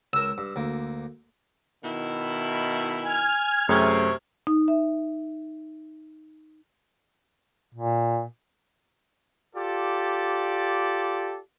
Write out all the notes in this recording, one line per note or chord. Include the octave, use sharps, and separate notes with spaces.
C#2 A#4 E6
G2
D2 A#3
B2 D#3 E4
G#5 F6 G#6
F#2 C3 A3 G#4 C#6
D#4
E5
A#2
F4 G4 A4 D5